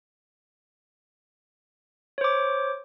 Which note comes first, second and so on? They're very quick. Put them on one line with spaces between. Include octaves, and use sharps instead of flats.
C#5 C5 D6